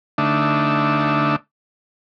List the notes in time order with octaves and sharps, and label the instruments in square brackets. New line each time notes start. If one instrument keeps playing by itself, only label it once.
[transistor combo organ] D3 A3 D4 D#4 E5